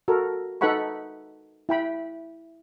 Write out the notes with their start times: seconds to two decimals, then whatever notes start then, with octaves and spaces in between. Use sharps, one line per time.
0.08 F#4 A4 A#4
0.61 D#4 A4 B4 F#5 B5 C#6
1.69 E4 G5 B5